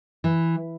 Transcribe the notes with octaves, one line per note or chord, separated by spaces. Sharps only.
E3